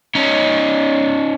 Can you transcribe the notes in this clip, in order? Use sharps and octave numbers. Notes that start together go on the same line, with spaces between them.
C#4 D#4